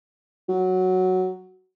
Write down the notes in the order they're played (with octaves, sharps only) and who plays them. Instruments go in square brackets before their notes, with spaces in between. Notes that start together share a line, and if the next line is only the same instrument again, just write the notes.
[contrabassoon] F#3